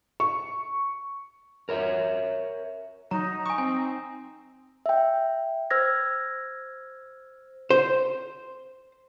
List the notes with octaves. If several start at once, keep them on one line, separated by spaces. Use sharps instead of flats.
C#6
A#4 C#5 E5
F#3 D#4 A#5
G#5 C#6 D#6
C4 G#5
E5 G5
C5 E6 F6 G#6 A#6
C5